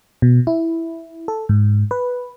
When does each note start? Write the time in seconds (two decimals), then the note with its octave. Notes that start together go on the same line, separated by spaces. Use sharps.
0.22 B2
0.47 E4
1.28 A4
1.49 G#2
1.91 B4